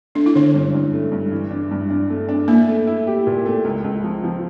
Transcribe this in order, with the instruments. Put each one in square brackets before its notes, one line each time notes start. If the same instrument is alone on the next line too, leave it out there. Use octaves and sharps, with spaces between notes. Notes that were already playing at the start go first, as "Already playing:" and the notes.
[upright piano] A3 [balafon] D4
[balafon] E4
[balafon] D3 D4 [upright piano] C#4
[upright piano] G2
G2
A3
G2
E3
D4
G2
D4
A3
D4
[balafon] A#3 [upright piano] E4
[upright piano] A3
E4
G4
A#2
A3
C#2
C#2
F3
F3